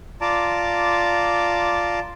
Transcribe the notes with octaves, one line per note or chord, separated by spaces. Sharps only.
F4 D5 A5 A#5 D6